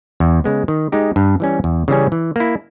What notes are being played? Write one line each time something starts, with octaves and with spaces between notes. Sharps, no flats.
E2
C#3 G#3 B3
D#3
G#3 D#4 G4
G2
E3 G3 C#4
E2
C#3 E3 G3 C#4
E3
A#3 E4